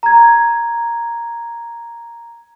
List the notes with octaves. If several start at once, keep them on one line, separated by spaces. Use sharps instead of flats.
A#5 G#6